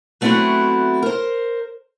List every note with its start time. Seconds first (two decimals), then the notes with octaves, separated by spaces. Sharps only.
0.21 F#3 A3 B3 C4 E4 F#4
1.02 A#4 C5